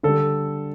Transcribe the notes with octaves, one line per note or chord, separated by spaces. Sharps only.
D3 G3 A4